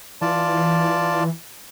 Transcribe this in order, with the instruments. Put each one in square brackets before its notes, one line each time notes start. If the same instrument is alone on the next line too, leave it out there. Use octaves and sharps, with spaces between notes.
[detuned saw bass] E3 [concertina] F4 D5 A5